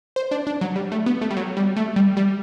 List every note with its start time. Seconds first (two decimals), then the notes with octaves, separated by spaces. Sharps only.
0.16 C5
0.31 D4
0.47 D4
0.61 F#3
0.76 G3
0.92 A3
1.06 B3
1.22 A3
1.31 G3
1.37 F#3
1.57 G3
1.76 A3
1.96 G3
2.17 G3